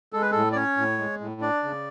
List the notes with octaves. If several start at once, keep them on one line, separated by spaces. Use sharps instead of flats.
G#3 A4
B4
A2 A4
D5
C#4 C#5
A2
G#3
A2
D4 D5
C#3